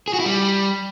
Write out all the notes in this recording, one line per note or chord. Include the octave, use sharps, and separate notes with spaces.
G#4
F#4
E4
G3